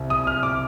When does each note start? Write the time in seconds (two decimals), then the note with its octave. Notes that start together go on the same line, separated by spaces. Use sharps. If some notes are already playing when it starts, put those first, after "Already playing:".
Already playing: C2
0.10 D#6
0.27 F6
0.43 D6